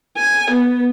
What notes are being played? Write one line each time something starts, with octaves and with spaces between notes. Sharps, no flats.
G#5
B3